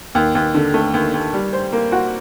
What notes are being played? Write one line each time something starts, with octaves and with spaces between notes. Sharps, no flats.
D#2
D#2
D3
A3
D#2
D#2
G3
C5
A#3
F#4